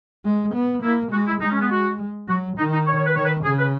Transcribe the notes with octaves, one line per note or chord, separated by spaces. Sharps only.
G#3
B3
A#3 E4
G#3 F#4
E4
G#3 D#4
C#4
B3
F#4
F#3 F#4
D#3 D#4
D#4
C#5
C#5
B4
D#3 C#5
B4
C#3 G#4
B4